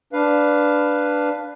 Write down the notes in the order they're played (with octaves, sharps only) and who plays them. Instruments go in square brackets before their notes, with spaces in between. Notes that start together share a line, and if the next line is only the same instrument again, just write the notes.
[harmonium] D4 B4 F5